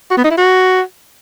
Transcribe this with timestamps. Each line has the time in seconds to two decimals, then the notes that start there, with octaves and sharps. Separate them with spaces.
0.11 F#4
0.17 B3
0.24 D#4
0.31 E4
0.37 F#4